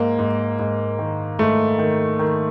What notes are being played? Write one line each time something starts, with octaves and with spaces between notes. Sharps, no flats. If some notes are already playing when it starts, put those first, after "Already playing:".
Already playing: G#2 A#3
G#2
G#2
D#3
G#2 A3
D#3
D#3